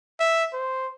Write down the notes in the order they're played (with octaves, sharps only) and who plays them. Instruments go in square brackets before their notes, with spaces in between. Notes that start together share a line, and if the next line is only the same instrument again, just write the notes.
[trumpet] E5
C5